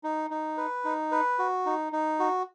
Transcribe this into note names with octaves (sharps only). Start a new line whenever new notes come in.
D#4
D#4
B4
D#4
B4
F#4
D#4
D#4
F#4